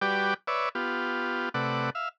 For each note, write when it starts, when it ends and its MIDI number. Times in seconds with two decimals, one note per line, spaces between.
0.01 0.34 55
0.01 0.34 66
0.01 0.34 67
0.01 0.34 71
0.01 0.34 74
0.01 0.34 79
0.47 0.69 71
0.47 0.69 73
0.47 0.69 74
0.47 0.69 76
0.75 1.49 59
0.75 1.49 65
0.75 1.49 67
1.54 1.90 48
1.54 1.90 57
1.54 1.90 71
1.54 1.90 74
1.54 1.90 78
1.95 2.09 76
1.95 2.09 77